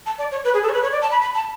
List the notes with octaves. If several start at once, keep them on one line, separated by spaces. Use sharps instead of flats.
A5
D5
C#5
B4
G#4
A4
C#5
B4
C#5
D5
A5
B5
B5
A5